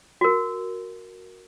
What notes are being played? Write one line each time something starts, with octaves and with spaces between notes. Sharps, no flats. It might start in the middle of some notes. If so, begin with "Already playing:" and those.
F#4 A#4